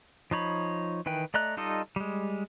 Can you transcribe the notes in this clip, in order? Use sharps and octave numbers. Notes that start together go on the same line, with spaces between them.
F3 D#4 C#5 B5
D#3 E3 B4 G5
A3 D5 D#5 A#5 F#6
G3 D#4 F4 A4 D#5
G3 G#3